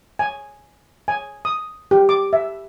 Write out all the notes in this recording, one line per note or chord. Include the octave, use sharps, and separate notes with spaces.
G#5
G#5
D#6
G4
D6
E5